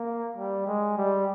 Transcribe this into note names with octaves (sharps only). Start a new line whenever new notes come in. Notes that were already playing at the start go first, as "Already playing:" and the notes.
Already playing: A#3
G3
G#3
G3